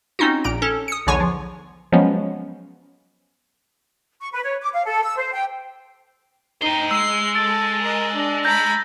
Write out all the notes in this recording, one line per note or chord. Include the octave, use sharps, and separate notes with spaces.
C4 C#4 D#4 F4 F#4
A#1 A#2 A#5 D7
C#4 A4
D#6 C#7
B1 E2 D3 C#5 G#5 C#6
F3
F3 F#3 G#3 B3 C#4
C#6
B4
C#5
D6
F5
A4
E6
C5
G5
D#4 C5 D#5 G5 G7
G#3 E6 C7
A4 A5 E6 A6 D7
A#4 D#5
D4
A#5 B5 G6 A#6